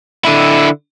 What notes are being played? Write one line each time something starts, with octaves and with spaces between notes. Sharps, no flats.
D3 E4